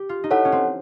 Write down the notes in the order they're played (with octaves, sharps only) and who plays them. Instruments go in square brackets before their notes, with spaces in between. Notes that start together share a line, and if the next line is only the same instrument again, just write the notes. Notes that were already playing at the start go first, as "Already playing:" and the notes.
Already playing: [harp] G4
F4
D#4
[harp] E4 [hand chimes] A4 C#5 F#5
[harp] C#4
C4